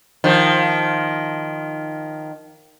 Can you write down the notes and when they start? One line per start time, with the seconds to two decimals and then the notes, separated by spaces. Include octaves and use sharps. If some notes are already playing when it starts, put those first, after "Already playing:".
0.24 D#3 F3